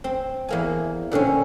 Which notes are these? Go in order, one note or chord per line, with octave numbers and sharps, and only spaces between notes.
C4
E2 A#3 G#5
A#2 D3 C4 C#4